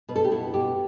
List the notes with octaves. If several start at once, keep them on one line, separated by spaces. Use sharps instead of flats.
B2 B4
A4
G4
B2 E4
B2 G4